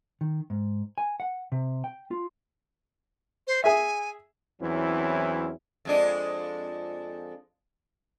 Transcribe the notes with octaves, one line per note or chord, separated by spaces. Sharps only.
D#3
G#2
G#5
F#5
C3
G5
F4
C5
G#4 E5 G#5
E2 E3 F#3 C4 C#4 E4
F2 G#3 D4